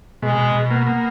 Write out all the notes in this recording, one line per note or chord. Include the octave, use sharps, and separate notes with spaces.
B2 G#3
B2
B2
A#3 B3
A#3